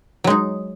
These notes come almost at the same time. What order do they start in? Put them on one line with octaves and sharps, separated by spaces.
F#3 G#3 D#4